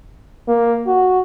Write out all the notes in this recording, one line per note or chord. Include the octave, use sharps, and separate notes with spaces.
A#3
F#4